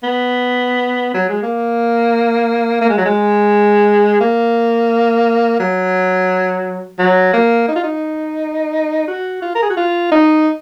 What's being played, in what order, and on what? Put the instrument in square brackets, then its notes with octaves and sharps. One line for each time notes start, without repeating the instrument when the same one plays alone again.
[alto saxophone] B3
F#3
G#3
A#3
A#3
G#3
F#3
G#3
A#3
F#3
F#3
A#3
D#4
F4
D#4
F#4
F4
A#4
G#4
F#4
F4
D#4